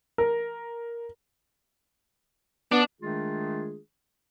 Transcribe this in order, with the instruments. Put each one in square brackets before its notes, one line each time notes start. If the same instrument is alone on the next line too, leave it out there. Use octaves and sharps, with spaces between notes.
[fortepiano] A#4
[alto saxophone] B3 [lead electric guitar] D4
[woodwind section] D#3 G#3 A3 D4 F4 G#4